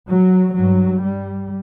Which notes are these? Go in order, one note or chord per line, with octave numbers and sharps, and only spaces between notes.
F#3
G2 F#3
G3